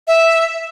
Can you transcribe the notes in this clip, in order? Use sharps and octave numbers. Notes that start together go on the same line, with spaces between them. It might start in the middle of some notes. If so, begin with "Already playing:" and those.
E5